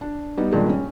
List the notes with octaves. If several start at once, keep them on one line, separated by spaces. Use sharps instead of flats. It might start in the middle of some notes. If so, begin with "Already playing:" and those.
D4
G3 B3 D#4
G2 A#2 D#3 G#3
C#4